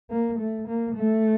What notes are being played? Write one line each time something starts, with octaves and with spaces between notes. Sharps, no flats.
A#3
A3
A#3
A3